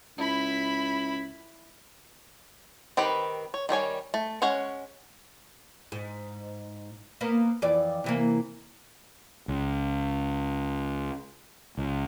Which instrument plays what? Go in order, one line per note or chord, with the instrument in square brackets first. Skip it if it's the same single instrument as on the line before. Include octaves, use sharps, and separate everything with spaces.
[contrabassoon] C#2 [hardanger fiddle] E4 B5
[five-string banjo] D#3 C4 G4 B4 B5
C#5
D#3 G3 C#5 G#5
A3
G#3 C#4 C#5 F#5
[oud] G#2
A#3 B3
F2 E3 D5
C3 E3 A#3
[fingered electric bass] C#2
C#2